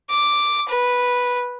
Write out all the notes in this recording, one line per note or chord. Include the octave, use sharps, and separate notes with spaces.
D6
B4